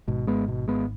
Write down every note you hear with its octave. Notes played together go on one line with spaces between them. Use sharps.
G#1 G#2 B2
G#3 B3
B2
G#3 B3